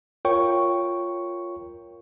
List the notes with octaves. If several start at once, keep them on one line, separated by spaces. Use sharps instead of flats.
F4 A#4 C#5 G5 C#6